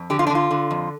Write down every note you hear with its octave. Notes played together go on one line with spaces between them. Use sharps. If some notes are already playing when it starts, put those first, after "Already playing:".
Already playing: F2
D3 G4
F4
D4
D3
F4
D3
F2